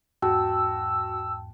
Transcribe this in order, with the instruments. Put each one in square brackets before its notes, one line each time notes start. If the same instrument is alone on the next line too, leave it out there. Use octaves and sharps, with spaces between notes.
[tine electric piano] E2 G#2 [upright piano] F#4 [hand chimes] G5 A5 [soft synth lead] E6